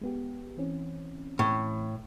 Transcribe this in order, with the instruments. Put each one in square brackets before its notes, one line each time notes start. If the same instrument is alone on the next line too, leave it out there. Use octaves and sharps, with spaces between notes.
[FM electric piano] G#3 B3 G4
E3 C4 C#4
[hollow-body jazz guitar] A2